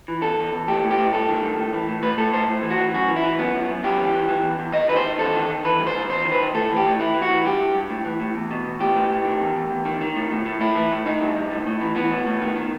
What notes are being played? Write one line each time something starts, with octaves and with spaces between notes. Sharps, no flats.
E3
E2 A4
E2
E2
A2 G4
A2
G4
A2
G2 A4
D#3
G2
A2
E3
A2
A2 B4
A2 A4
A2 C5
A2
E3
F#4
E3
F#2 F#4
E3
E4
E3
F#2 B3
F#2
F#2
F#2 G4
E3
E3
E3
E2
E2
D#3 D#5
D#3 B4
C5
D#3
E2 A4
D#3
D#3
E3 B4
G2
C5
G2
E2 C5
D#3
B4
D#3
A2 A4
E3
G4
A2
E3 E4
E3
F#4
E3
G2 G4
G2
G2
A2
E3
A2
E2
B2
E2
A2 G4
A2
A2
D#3
E2
E2
E2
D#3
D#3
A2
A2
A2
A2 E4
E3
A2
D#3 D#4
G2
G2
A2
A2
E3
E3 B3
A2
A2
D#3
D#3